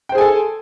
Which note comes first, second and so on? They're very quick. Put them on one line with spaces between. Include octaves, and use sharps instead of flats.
G5 C5 G#4 G#5 A4